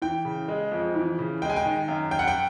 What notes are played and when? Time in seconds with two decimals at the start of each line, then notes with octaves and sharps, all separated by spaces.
0.02 E3 G5
0.25 C#3
0.48 G#3
0.72 F2
0.95 E3
1.19 C#3
1.42 G#3 G5
1.50 G#5
1.56 G5
1.66 D#3
1.88 F#2
2.11 F#2 G5
2.19 F#5
2.28 G5